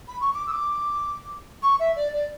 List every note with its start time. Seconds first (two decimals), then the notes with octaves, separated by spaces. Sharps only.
0.08 B5
0.21 C#6
0.34 D6
0.47 E6
0.52 D6
1.63 C#6
1.80 E5
1.96 D5
2.14 D5